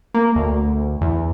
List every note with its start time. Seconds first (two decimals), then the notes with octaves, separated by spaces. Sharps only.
0.14 A#3
0.36 D2
1.01 E2